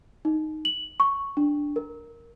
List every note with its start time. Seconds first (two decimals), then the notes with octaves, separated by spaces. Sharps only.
0.25 D#4
0.65 F#7
1.00 C#6
1.37 D4
1.76 A#4